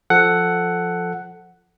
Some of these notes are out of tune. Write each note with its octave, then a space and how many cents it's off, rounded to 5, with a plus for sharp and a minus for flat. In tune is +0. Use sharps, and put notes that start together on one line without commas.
F3 +0 A4 +0 F#5 +5